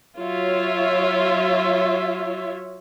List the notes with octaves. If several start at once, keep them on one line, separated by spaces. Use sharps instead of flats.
F#3 F4 C#5 E5